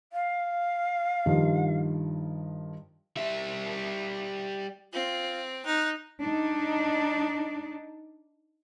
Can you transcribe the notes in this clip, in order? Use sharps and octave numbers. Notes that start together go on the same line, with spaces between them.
F5
G2 D#3 F3
G3 E5
C4 F4
D#4 F#6
D4 D#4